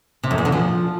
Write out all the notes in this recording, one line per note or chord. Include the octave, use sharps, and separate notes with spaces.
C3
F2
E2
D3
F3